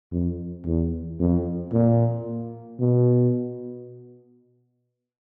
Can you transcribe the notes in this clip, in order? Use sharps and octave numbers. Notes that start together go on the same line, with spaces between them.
F2
E2
F2
A#2
B2